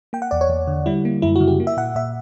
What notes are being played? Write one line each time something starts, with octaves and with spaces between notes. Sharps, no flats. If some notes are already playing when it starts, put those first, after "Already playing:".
A#3 G5
F#5
E2 D5
C#5
E2
D3
G3 E4
A#3
F#2 E4
F#4
C#3
G4
A#3
E5
A#2 F#5
A#2 E5